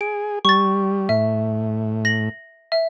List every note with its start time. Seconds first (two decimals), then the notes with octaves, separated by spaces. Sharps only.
0.01 G#4 D7
0.45 G3 C#6 A6
1.09 A2 E5
2.05 A#6 F#7
2.72 E5